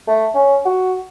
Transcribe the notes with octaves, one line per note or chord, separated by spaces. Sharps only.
A3
C#4
F#4